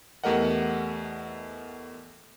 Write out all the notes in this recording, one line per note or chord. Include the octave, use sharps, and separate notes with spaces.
E2 A3 G4 A#4 D#5 F#5